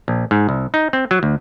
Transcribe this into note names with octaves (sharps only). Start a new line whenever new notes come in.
A#1
G#2
C2
D#4
C4
F#3
D2